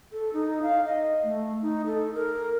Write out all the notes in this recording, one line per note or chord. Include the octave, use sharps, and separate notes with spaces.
A4
D#4
F5
D#5
A3
D#4
A4
A#4